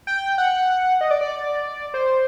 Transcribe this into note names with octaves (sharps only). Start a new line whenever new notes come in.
G5
F#5
D#5
D5
D5
C5